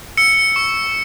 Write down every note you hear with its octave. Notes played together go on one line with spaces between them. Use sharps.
E6 C#7
C#6